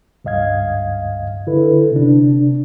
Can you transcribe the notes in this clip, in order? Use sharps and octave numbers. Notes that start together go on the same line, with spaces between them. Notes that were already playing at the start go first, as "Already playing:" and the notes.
C#2 G2 D#5 F5 G#6
D3 E4 A4 B4
C3 D4